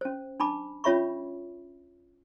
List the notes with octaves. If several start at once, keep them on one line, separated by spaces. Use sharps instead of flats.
C#4 C5
D4 A5 B5 D6
C#4 F4 C#5 E5 B5 C#6